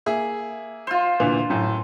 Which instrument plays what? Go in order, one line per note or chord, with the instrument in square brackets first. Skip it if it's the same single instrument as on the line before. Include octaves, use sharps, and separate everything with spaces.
[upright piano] A#3 G#4 E5
[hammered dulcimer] F4 C5
[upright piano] D2 A#2 E3
F#2 A2